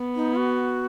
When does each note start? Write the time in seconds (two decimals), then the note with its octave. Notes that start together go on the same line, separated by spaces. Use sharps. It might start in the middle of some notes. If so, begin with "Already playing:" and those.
Already playing: B3
0.16 D#4
0.38 F#4